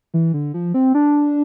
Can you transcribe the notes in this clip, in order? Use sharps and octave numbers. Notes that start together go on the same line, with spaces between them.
E3
D3
F3
C4
D4